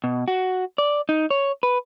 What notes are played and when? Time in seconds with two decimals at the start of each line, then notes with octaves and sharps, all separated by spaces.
0.04 B2
0.28 F#4
0.78 D5
1.09 D#4
1.31 C#5
1.63 B4